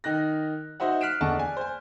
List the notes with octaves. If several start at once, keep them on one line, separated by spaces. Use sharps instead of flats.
D#3 D#4 F#6 A#6
D#4 F#4 C5 D#5 E5 F#5
F6 F#6 B6 C7 D7 E7
E2 D3 D#5 F#5 A5 C#6
D5 G#5
C5 G#5